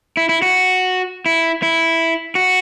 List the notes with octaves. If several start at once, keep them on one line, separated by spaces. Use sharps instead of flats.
E4
E4
F#4
E4
E4
F#4